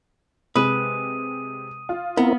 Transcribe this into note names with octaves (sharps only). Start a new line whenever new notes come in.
C3 G#3 B4 D#6 D#7
F4
B3 C4 E4 A#4